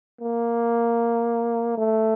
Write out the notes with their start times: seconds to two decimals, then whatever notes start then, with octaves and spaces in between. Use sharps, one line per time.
0.21 A#3
1.78 A3